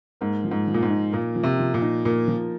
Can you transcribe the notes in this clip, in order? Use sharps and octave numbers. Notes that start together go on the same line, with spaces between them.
G#2 A#3
F3
G#2
F3
A#2
G#2
D#4
A#2 A#3
F3
C3
F3
A#2
D#4
A#2 A#3
F3